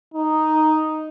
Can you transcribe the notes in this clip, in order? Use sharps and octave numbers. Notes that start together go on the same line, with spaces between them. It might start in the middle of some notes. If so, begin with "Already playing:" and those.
D#4